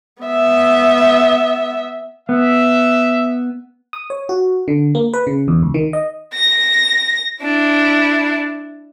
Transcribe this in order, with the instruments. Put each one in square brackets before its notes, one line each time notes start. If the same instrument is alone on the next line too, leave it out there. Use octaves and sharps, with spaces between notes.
[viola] B3 E5
[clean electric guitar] B3 [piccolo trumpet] E5
[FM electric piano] D#6
C#5
F#4
D3
A#3
B4
C#3
E2
C#2
D#3
D#5
[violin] A#6
D4 E4